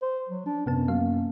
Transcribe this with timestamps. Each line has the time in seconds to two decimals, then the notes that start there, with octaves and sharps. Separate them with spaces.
0.02 C5
0.29 F#3
0.46 D4
0.66 F#2 C3 B3 A5
0.88 F#3 A#3 F5